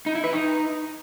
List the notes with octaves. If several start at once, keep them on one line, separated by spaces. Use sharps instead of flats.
D#4
E4
B4
D#4